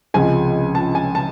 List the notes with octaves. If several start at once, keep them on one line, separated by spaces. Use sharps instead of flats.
C#2 C3 F3 G#3 G#5
A5
G#5
A5